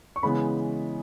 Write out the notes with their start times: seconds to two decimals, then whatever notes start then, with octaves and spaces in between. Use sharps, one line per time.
0.16 C#6
0.23 C#3 E3 G#3 B3 B5